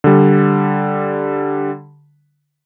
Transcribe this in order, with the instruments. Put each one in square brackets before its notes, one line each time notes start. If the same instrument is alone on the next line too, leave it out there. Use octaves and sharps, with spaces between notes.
[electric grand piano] D3 G3